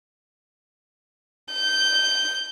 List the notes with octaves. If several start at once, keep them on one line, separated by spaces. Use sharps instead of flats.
G6